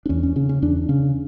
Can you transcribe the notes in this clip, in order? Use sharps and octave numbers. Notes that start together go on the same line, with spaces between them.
D4
E2 C#4
C#4
C#3 C#4
C#4
E2 D4
C#3 C#4